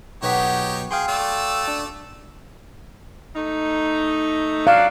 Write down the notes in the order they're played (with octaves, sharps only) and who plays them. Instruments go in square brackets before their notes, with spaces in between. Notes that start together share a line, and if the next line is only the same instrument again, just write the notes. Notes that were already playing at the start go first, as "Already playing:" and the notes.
[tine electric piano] B1 B3 B6 [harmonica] D#4 G4 C#5 [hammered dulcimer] F#4
[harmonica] G#4 [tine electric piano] F5 G5 C6
[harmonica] A3 D5 E6
[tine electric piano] D4
[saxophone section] A3 D#4
[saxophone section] F#3 D4 [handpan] F5